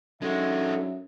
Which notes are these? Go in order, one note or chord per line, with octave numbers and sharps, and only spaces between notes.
F#2 G#3 D4 D#4 F#4 A4 E5